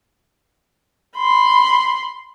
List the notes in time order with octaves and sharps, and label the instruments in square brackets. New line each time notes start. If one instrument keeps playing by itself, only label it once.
[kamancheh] B5 C6